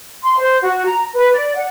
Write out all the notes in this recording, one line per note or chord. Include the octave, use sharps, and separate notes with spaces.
C6
C5
F#4
A#5
B4
D5
F#5